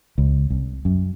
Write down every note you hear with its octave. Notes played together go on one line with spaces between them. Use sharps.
C#2
C2
F#2